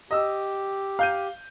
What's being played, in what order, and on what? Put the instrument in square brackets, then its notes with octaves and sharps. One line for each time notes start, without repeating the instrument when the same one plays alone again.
[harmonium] G4 [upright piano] D#5 E6
[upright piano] F5 G6 D#7